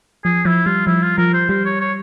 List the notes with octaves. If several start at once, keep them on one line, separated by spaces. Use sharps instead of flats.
F3 G#4
F3 E4
G3 F4
F3 E4
F4
F3 A#4
C5
G3 C5
C#5
C#5